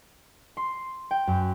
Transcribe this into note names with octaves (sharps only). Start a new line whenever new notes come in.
C6
G5
F#2